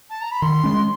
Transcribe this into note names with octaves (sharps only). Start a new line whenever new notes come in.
A5
A#5
B5
D#3 C6
G#3 C#4